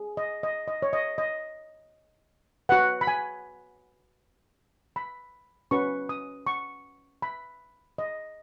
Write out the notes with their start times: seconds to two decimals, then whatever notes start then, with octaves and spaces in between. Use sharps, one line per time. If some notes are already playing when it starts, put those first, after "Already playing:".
Already playing: G#4
0.17 D#5
0.43 D#5
0.68 D#5
0.82 C#5
0.93 D#5
1.18 D#5
2.69 F#4 B4 F#5
3.01 B5
3.07 G#5
4.96 B5
5.71 C#4 F#4 B4 C#6
6.09 D#6
6.47 C#6
7.22 B5
7.98 D#5